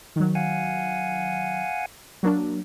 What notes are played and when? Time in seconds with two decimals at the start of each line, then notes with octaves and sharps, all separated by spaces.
0.16 D#3 F#3
0.35 F5 F#5 G#5
2.23 F#3 A#3 D4